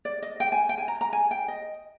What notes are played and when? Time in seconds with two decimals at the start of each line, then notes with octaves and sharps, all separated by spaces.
0.05 D5
0.22 D#5
0.40 G5
0.52 G#5
0.69 G5
0.78 G#5
0.88 A#5
1.01 A#5
1.13 G#5
1.31 G5
1.48 D#5